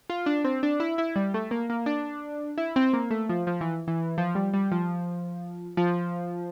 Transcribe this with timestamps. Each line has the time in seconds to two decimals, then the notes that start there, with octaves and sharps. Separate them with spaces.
0.10 F4
0.26 D4
0.44 C4
0.63 D4
0.80 E4
0.98 E4
1.16 G3
1.34 A3
1.51 A#3
1.70 A#3
1.86 D4
2.58 E4
2.76 C4
2.93 A#3
3.11 A3
3.29 F3
3.47 F3
3.61 E3
3.88 E3
4.18 F3
4.35 G3
4.53 G3
4.72 F3
5.77 F3